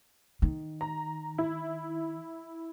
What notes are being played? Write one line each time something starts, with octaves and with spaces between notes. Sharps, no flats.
D#3
A#5
E4